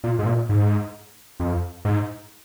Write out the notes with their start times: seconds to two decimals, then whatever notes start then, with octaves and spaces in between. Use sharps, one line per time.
0.04 A#2
0.19 G#2
0.26 A#2
0.49 G#2
1.40 F2
1.85 G#2